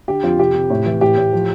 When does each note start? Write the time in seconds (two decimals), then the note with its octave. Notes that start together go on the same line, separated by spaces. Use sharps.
0.08 D3 G4
0.23 F2 F4
0.39 C3 G4
0.54 C3
0.70 A2
0.86 E3
1.01 A2 G4
1.17 A2
1.33 F3